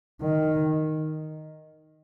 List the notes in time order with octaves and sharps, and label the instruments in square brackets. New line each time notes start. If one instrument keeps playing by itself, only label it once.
[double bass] D#3